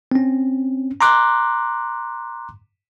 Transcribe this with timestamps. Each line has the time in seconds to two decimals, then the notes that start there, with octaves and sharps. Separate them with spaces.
0.12 C4 C#4
1.01 A#5 C6 D6 F#6